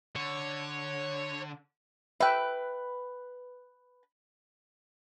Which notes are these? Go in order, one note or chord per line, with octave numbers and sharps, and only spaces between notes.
D3 C#5
B4 E5 G5 F#6